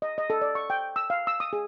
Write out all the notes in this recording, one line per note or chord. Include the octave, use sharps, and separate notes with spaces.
D#5
D#5
A4
D5
C#6
G5
E6
F5
E6
D#6
G#4